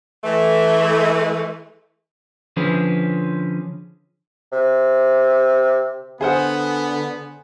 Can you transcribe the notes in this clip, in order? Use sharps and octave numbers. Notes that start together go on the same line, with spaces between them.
E3 A3
D3 F3 C#4 G#4 B4
C3
D3 B3 G#4 C5 F#5